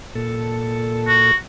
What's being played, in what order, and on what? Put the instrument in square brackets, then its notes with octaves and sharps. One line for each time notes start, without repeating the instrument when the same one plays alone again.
[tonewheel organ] A#2 A4
[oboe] F#4